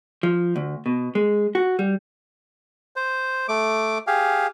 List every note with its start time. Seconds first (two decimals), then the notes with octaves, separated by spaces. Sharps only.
0.23 F3
0.56 D2
0.86 B2
1.15 G#3
1.55 F#4
1.79 G3
2.96 C5
3.48 A3 D6
4.07 G4 G#4 F5